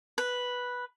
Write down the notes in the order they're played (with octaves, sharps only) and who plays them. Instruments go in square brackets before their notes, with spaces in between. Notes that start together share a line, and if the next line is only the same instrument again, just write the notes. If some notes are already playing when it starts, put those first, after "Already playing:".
[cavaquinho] B4